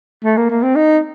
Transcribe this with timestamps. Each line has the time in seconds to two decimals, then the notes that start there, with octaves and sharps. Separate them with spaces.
0.24 A3
0.37 A#3
0.50 A#3
0.62 C4
0.75 D#4